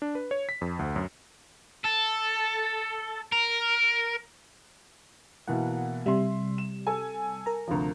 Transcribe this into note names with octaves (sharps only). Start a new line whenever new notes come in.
D4
B4
C#5
B6
F2
D2
F#2
A4
A#4
B2 E3 A#3 F#5
C3 G3 E5 C6
E7
A4 G#5
A#4 A#5
D2 C3 F3